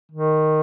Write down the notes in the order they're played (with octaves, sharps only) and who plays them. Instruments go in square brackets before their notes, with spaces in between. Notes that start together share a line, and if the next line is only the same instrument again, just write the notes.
[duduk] D#3